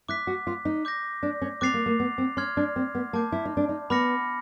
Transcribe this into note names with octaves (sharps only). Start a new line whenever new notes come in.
E4 D6 F#6 B6
F#4
F4
D#4
D6 G6 A#6
D4
C#4
C4 D6 F#6 A6 C7 F7
A#3
A#3
B3
C4
C#4 C6 F6 G#6
D4
C4
B3
A#3 A5 D6 G6
E4
D#4
D4
D#4
B3 B5 D6 F6 A#6 C#7